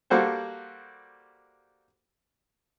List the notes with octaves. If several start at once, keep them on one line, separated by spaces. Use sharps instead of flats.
G3 A#3 F#4 A4 C5